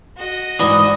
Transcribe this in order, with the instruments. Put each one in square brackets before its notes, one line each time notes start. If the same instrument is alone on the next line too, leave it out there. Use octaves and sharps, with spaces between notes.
[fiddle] F#4 D#5
[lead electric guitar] G#2 E3 [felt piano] D5 [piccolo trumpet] D#6